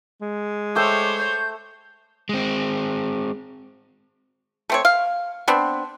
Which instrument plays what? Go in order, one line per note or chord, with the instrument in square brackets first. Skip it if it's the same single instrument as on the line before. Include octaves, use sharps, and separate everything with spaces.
[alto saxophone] G#3
[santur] A3 G5 E6 [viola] C5 C#5 [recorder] D6
[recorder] G6
[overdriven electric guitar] G#3 C4
[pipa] A3 C4 C#5
F5
B3 C4 D4